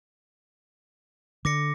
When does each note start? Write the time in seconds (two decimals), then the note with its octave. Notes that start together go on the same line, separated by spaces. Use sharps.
1.45 D3 D6 A#6 C#7